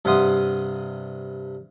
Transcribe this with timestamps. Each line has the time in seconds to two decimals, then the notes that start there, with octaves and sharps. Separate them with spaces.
0.05 G2 C3 F5 F#5 C6 D#6